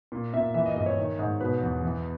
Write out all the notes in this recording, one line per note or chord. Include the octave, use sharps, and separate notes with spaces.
A#2
A#2 E5
E3 E5
D#5
G2 D#5
C#5
D#3
G#2
B2 B4
E2
E3